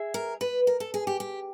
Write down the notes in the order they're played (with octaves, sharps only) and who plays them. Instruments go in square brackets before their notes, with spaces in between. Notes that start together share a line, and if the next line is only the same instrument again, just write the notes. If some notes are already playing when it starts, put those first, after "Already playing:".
Already playing: [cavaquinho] G#4 E5
[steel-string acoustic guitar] A#4
B4
A#4
A4
G#4
G4
G4